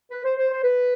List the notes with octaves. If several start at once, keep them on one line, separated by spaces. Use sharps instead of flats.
B4
C5
C5
C5
B4